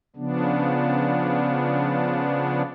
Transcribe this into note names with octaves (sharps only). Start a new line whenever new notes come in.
C#3 F3 B3 D4